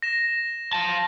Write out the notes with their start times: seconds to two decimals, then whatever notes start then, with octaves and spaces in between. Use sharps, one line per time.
0.02 A#6 E7
0.73 F5 A5